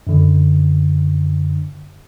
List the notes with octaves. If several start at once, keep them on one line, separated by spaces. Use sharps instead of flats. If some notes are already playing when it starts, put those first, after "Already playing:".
F#2 D3